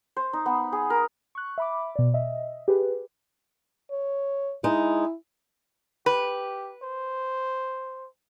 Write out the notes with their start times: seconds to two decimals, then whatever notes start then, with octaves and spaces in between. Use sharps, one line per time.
0.17 C5
0.33 D#4
0.46 B3
0.72 G#4
0.90 A#4
1.35 C#6 F#6
1.58 E5 B5 D6
1.96 B2 D5
2.14 D#5 E5
2.68 G4 G#4 B4
3.91 C#5
4.64 G#3 D#4 E4
6.06 G4 B4
6.83 C5